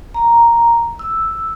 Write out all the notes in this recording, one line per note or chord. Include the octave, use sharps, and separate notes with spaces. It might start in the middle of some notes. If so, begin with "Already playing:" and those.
A#5
E6